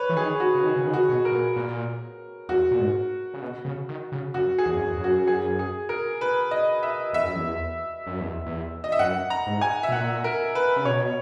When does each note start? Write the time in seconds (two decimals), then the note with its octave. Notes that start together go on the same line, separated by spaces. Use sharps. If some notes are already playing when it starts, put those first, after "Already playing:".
Already playing: B4 C#5
0.09 E3
0.16 D#3 G#4
0.40 F#4
0.55 C#3
0.63 D#3
0.76 C#3
0.87 D#3
0.94 F#4
1.09 B2
1.25 A#4
1.32 A#2
1.56 A#2
2.49 E2 F#4
2.71 A#2
2.79 G#2
3.34 C#3
3.41 B2
3.65 C#3
3.89 D#3
4.12 C#3
4.34 F#2 F#4
4.58 G#4
4.66 E2
4.75 F#2
4.84 E2
4.97 F#2
5.04 F#4
5.27 G#4
5.59 G#4
5.89 A#4
6.21 B4
6.51 D#5
6.83 E5
7.13 E2 E5
7.24 F#2
7.35 E2
8.06 F#2
8.20 E2
8.46 E2
8.84 D#5
8.92 E5
8.99 F#2 F#5
9.30 A#5
9.47 G#2
9.61 G#5
9.83 E5
9.89 B2
9.92 A#2 F#5
10.24 A#4
10.55 B4
10.76 C#3
10.85 B2 C#5